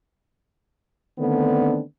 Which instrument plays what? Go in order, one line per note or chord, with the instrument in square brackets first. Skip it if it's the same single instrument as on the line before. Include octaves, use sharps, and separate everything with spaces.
[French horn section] D3 D#3 A3 B3 C4 D4